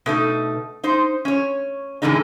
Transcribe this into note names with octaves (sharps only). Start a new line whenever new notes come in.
B2 A3 D#4
D#4 C5
C#4 C#5
F#2 A2 D3 E3 G#3 D#4